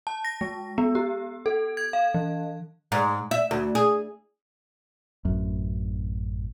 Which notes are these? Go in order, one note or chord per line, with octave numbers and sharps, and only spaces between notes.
A5
A#6
G#3
B3
G4
A4
G#6
F5
E3
G#2
E5
D2
G#4
A1 F#2